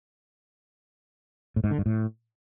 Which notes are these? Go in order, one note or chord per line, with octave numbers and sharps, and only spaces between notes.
A2
G#2
D3
G2
A2